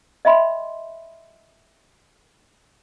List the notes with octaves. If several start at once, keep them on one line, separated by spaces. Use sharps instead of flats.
D#5 E5 G5 B5 C6